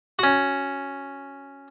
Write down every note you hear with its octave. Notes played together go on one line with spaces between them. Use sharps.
C#4 F#4